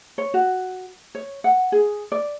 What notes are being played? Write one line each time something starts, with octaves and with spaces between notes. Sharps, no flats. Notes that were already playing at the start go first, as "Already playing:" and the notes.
C#5
F#4
C#5
F#5
G#4
D5